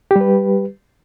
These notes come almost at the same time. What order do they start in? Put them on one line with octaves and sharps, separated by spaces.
G4 G3 B4